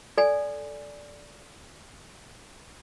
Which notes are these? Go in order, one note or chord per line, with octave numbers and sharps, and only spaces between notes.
A4 D5 G#5